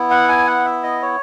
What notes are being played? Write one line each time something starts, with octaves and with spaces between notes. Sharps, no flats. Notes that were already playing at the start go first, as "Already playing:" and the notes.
Already playing: B3 E4
F#5
G#5
F#5
E5
D#5
C#5